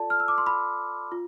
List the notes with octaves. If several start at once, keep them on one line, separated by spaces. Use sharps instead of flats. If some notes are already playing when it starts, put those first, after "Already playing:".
Already playing: F4 A4 D5 A5
F6
E6
D6
C6
B5
F4